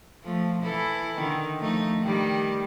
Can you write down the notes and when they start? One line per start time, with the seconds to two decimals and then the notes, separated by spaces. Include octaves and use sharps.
0.23 F3 A3
0.62 E3 E4 A4
1.17 D3 D#3
1.59 F3 A3 D#4
2.02 D#3 G3